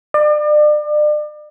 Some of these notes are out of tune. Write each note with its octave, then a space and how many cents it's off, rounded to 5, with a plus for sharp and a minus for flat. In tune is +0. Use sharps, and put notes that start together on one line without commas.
D5 +35